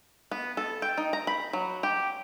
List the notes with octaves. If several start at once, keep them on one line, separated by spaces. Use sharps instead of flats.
B3
A4
G5
D#4
A#5
B5
F#3
G4